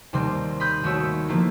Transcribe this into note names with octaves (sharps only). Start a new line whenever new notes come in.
D#2 C3 G3 C4 C6
B5 C6 D#6 F6 G6 B6
D#2 A3 F#4 C#5 E6
F3 A3 A#3 E4